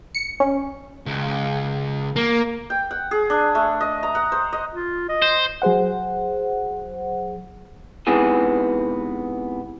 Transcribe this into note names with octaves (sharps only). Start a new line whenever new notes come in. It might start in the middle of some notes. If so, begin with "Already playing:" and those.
C#7
C#4
C#2
A#3
G5
F#5
G#4
D4
A3
D#5
A#5
F#5
C5
D#5
F4
D#5
C5
F#3 G#4 C5 F#5
G#2 C3 E3 B3 G#4